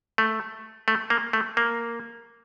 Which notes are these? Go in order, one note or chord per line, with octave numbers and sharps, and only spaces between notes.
A3
A3
A#3
A3
A#3